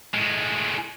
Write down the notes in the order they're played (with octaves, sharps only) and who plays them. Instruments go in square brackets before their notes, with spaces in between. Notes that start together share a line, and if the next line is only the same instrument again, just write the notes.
[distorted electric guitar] A2 G#3